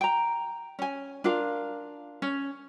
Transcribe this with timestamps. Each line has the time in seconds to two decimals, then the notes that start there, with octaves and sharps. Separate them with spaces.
0.01 G5 A#5
0.79 C#4 G#5
1.24 D4 F4 A#4 F5
2.22 C#4